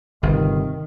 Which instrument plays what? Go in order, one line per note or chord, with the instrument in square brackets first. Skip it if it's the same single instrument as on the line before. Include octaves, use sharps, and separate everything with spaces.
[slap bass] G1 [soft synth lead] C3 [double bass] D#3